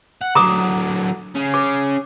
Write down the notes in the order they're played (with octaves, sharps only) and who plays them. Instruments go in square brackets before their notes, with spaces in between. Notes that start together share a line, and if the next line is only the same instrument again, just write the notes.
[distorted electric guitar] F#5
[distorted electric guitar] D3 F#3 [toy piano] A#5 D6 D#6
[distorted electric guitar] C#4 G#4
[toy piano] D6